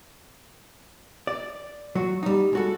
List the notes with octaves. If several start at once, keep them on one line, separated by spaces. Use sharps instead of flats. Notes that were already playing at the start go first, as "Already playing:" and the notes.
D5
F#3 F#4
G3 D#4
G#3 F#4 A4